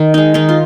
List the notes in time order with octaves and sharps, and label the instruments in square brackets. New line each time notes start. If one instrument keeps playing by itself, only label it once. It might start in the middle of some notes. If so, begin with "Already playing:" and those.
Already playing: [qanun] D#3
G#3 D#4
D#3 D#4
F4